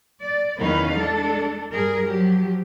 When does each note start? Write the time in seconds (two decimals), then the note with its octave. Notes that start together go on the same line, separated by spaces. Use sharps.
0.21 D5
0.60 E2 D#3 C#4 D#4 B4 F5
0.96 G#3 D4 A4
1.71 G2 G#4 A#4
2.10 F3 F#3 G4